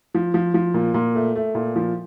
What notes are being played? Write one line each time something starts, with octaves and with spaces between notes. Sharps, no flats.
F3
F3
F3
A#2
A#2
A3
A3
A#2
F3